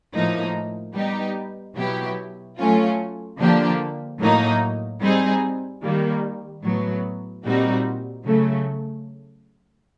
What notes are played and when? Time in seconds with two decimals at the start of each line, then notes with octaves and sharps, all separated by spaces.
0.14 A2 F3 A#3 D#4
0.95 G3 B3 D#4 G4
1.76 B2 F#3 B3 E4 G4
2.57 F#3 A3 C#4 F4
3.39 D3 F3 A#3 D4 G4
4.20 A2 F#3 A#3 D#4
5.01 G3 C4 D#4 G#4
5.82 D#3 G3 A#3
6.63 A2 F#3 B3
7.44 A#2 G3 C4 D#4 F#4
8.25 C#3 F#3 A3